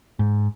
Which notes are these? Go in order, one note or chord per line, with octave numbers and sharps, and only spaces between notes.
G#2